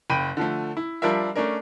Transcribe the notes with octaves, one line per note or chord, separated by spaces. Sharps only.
F#1 G5 B5 D#7
D3 F3 A3
E4
F3 G3 D4 F4 A#4 E5
A3 C#4 D4 A#4